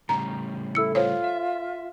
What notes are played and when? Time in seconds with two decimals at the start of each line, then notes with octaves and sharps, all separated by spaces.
0.09 A2 C#3 G3 A#5
0.75 E4 A4 E6 C#7
0.95 F4 C5 C#5
1.24 E5